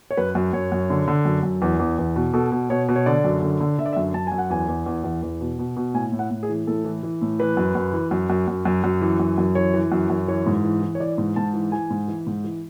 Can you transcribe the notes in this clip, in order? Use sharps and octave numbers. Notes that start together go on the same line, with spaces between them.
C#5
F#2 B4
F#2
F#2 C#5
F#2
D3
D3
F#2
F#2
E2
E2
E2
B2
B2 A4
B2
B2 C#5
B2
C#5
D3 D5
F#2
D3
D3
D3 E5
D5
E5
F#2
F#2 A5
F#2 G#5
F#5
E2 G#5
E2
E2
E2
E2
B2
B2
B2
A2 G#5
A2
F#5
A2
G#4
E3
A2 A4
E3
E3
A2
E3 B4
F#2
F#2
E3
F#2
F#2
F#2
F#2
F#2
E3
F#2
F#2
E3 C#5
E3
F#2
F#2
E3 C#5
G#2
E3
E3
C#5
E3 D5
G#2
G#2 A5
E3
E3 G#5
G#2
E3
G#2
E3